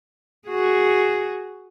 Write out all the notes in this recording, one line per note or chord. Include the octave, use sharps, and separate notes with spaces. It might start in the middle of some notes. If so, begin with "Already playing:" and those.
F#4 G#4